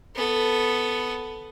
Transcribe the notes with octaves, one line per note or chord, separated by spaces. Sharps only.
B3 A4